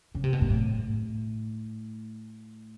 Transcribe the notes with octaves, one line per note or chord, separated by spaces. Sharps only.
C#3
C3
B2
A#2
A2